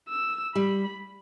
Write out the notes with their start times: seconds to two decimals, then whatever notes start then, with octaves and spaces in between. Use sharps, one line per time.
0.09 E6
0.55 G3 B5